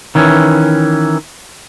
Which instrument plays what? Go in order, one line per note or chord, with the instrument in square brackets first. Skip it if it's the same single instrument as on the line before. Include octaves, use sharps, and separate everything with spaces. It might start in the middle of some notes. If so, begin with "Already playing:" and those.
[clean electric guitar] D#3 E3 C#4